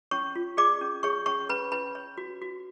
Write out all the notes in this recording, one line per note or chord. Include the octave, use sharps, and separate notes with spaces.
C#4 C#5 C#6
F4
G#4 D5 D6
C#4
G#4 C#5 C#6
C#4 C#5 C#6
C#4 B4 B5
C#4 B4 B5
C#5
F#4
F#4